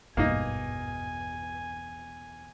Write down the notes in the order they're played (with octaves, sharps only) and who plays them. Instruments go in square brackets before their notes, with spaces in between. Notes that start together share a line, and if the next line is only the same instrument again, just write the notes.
[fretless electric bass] G#1 G2 [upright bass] E2 B2 [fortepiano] A#3 D#4 [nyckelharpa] G#5